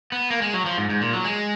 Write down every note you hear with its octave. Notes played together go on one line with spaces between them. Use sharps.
B3
A#3
G#3
F#3
F3
G#2
G#2
A#2
F#3
G#3